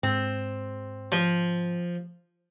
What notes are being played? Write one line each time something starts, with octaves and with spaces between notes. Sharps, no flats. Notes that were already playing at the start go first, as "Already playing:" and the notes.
G#2 C4
F3